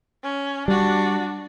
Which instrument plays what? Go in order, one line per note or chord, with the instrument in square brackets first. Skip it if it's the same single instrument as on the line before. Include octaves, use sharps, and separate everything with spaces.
[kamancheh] C#4
[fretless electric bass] G3 [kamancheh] D4 F#4